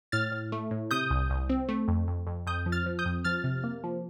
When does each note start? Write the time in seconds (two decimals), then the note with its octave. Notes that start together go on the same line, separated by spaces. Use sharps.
0.12 A2 F6 A6
0.32 A2
0.52 A3
0.71 A2
0.91 C3 D#6 G6
1.10 C2
1.30 C2
1.50 C4
1.69 A3
1.88 F2
2.08 F2
2.27 F2
2.47 F2 D#6 G6
2.66 F3
2.72 F6 A6
2.86 F3
2.99 D#6 G6
3.05 F2
3.24 F3 F6 A6
3.44 C3
3.64 A#3
3.84 F3